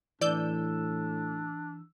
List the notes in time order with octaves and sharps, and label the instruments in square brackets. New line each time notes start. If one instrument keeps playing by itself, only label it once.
[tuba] A2 [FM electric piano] E3 E6 [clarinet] D4 [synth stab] D5 G6